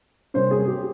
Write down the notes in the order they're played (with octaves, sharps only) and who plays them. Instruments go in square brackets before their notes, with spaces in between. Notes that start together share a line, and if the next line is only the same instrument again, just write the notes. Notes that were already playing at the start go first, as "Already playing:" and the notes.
[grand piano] C3 G3 A#3 C#4 C5
G#4
G4